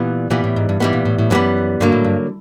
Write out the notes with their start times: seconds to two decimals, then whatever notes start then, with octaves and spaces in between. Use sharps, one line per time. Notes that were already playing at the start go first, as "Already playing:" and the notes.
Already playing: A#2 E3 G3 B3
0.30 A#2 E3 G3 B3
0.44 A2
0.56 G#2
0.69 G2
0.80 G#2 E3 G3 B3
0.93 A#2
1.05 A2
1.18 A2
1.30 F#2 E3 G3 B3
1.80 G2 D3 F#3 A#3
1.92 A2
2.04 G2